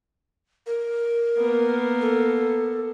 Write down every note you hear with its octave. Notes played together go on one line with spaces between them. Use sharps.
A#4
A#3 B3
A4